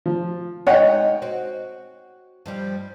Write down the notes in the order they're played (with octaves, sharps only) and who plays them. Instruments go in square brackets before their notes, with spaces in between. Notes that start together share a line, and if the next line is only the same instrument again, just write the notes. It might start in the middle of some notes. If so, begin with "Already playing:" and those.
[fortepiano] F3
[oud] G#3 D#4 D#5 [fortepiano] C#5 F#5 G5
[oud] C4 F#4
G2 F3 G3